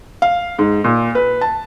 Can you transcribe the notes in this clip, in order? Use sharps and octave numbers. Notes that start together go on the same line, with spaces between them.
F5
G#2
A#2
B4
A5